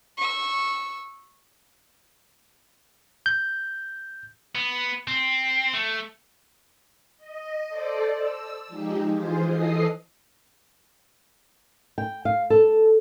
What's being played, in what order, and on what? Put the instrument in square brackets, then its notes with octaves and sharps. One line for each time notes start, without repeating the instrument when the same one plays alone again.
[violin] C#6 E6
[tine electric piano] G6
[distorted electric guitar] B3
C4
A3
[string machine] D#5
A4 C5 D5
E6
F3 G#3 D#4 G4
E3 F4 G#4 C5
E3 A4 D#5 D#6 C7
[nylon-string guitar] G5
F5
A4